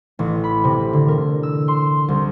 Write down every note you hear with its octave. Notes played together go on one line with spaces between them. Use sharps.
A1
B5
C3
D3
A#4
E6
C6
C2